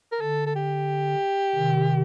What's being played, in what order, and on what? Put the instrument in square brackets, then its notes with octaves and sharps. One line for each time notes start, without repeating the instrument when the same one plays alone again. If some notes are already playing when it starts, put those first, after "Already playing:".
[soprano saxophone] A#4
[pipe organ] D3 [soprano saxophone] A4
[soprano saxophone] A4
G4
[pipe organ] C3 D#3